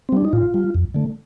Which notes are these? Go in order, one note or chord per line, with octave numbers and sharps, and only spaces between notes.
C4
G3 D4
D#4
A2 F4
G3
F2
D3 A3